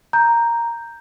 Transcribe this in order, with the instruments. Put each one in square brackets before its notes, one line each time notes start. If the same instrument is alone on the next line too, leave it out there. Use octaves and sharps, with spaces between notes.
[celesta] A#5 G6